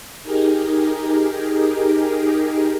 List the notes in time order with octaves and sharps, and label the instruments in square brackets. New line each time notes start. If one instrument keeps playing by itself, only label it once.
[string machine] D#4 G4 G#4 A#4